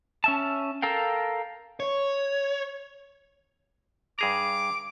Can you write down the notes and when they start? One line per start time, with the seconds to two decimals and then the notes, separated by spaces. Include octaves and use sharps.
0.24 C#4 E5 A5
0.82 A4 A#4 F5 G5
1.80 C#5
4.19 G2 G#4 A#5 D6